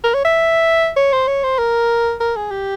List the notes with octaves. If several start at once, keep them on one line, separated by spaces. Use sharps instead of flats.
A#4
C#5
E5
C#5
C5
C#5
C5
A#4
A#4
G#4
G4